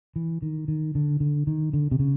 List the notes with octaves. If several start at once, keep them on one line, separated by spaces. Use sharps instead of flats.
E3
D#3
D#3
D3
D3
D#3
D3
C3
C#3